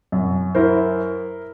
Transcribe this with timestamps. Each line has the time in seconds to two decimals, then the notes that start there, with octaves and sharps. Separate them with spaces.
0.12 F#2
0.55 E4 A#4 C5